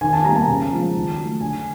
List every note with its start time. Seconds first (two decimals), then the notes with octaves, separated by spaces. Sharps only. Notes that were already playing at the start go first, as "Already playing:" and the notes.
0.01 D#3 G#5
0.13 A5
0.24 G3 A#3 A#5
0.36 A5
0.48 C#3
0.71 F3 G#3
0.95 D#3
1.18 F#3 A3
1.41 D3 G#5